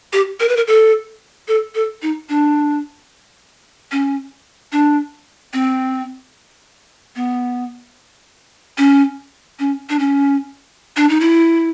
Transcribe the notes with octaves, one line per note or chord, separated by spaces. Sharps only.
G4
A#4
B4
A#4
A4
A4
A4
D#4
D4
C#4
D4
C4
B3
C#4
C#4
D4
C#4
D4
D#4
E4